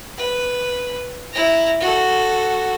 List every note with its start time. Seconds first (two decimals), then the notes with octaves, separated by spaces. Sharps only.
0.17 B4
1.33 E4 A#5
1.80 F#4 A4